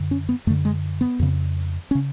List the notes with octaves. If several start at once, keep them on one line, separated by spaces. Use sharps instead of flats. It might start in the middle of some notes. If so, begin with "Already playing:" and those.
Already playing: F#2 D3
C#4
B3
F#2 D3 A3
G#3
B3
F2 C#3
C#4
C#3